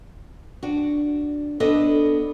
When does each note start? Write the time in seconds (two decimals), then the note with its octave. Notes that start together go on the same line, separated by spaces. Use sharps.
0.63 D4 F#4
1.60 B3 D4 A4 D#5